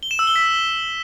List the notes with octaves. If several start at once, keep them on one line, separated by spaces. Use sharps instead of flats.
G7
E7
E6
G7
B6